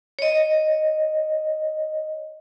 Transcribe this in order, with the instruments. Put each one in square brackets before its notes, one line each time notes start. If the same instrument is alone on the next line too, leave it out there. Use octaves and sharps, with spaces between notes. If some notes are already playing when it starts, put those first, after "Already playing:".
[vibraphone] C#5 D#5